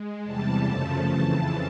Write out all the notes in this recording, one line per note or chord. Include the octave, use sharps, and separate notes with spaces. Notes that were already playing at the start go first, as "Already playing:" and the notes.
Already playing: G#3
E2 C3 E3 G3 A5
F#2 C#3 F3 A3
F2 C#3 E3